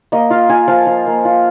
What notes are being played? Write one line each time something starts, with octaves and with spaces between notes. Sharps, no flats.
A#3 D#5
F4 F5
F4 G#5
F3 F5
F3
A#3
F4